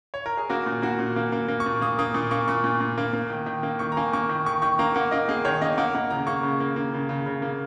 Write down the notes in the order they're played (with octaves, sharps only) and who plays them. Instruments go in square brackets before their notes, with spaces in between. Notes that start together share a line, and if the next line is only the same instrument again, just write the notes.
[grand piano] C#5
A#4
G#4
A#3 F#4
A#2
A#3 F#4
A#2
A#3
A#3
A#3
C#6
A#2
A#3 D#6
A#3 D#6
A#2 C#6
A#3 C#6
A#2 C#6
A#2
A#2
A#3
A#3
D#3
D#3
A#3
D#3 C#6
A#5
A#3 G#5
A#3 C#6
D#3
D#3 C#6
D#3 C#6
A#3 A#5
A#3 F#5
A#3 D#5
A#3 G#4
D#3 C#5
A#3 D#5
A#3 F#5
A#3 F#5
C#3 A#5
A#3 C#6
C#3
A#3
A#3
C#3
C#3
C#3
A#3